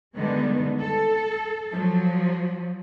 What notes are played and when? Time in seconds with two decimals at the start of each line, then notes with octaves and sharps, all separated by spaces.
0.16 D3 D#3 G3 G#3 B3
0.81 A4
1.72 F3 F#3